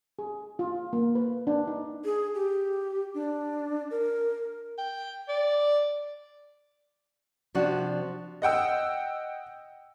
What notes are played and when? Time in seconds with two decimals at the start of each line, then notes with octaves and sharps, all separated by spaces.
0.19 G#4
0.59 F4
0.93 A#3
1.15 B4
1.47 D4
1.67 D#4
2.05 G#4
2.35 G4
3.14 D4
3.91 A#4
4.78 G5
5.28 D5
7.55 C3 F3 D4 F#4
8.42 D#5 F#5 G5 E6